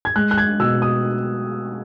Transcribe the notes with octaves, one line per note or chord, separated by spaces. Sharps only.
G#6
G#3 F#6
F#6
G#6
B2 E6
D#6